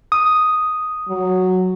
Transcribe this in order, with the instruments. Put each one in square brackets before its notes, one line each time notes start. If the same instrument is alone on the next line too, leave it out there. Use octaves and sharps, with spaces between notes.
[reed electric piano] D#6
[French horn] F#3